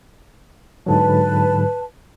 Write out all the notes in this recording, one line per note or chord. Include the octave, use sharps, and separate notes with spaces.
G#2 D3 F#3 B4 A5